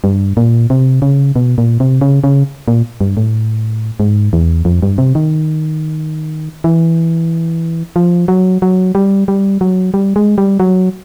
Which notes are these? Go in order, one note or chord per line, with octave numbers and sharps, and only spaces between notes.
G2
A#2
C3
C#3
B2
A#2
C3
C#3
C#3
A#2
G2
A2
G#2
E2
F2
G2
C3
D#3
E3
F3
F#3
F#3
G3
G3
F#3
G3
G#3
G3
F#3